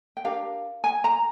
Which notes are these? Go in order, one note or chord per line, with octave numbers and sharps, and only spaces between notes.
G5
D4 G4 A#4 F5
G#5
A#5